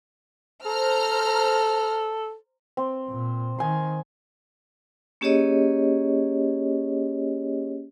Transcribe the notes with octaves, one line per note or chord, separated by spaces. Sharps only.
A4 C5 A#5 F6
C4
A#2
D#3 G#5 C6
A#3 C#4 G4 G#4 C#5 D#5